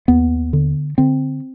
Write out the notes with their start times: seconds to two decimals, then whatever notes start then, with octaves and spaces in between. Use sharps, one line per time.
0.08 D#2 B3
0.53 D3
0.98 D3 C4